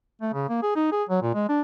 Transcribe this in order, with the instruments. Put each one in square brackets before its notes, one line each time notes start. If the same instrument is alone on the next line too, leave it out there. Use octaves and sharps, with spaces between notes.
[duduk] A3
C#3
A#3
G#4
D#4
G#4
F#3
A#2
G#3
D4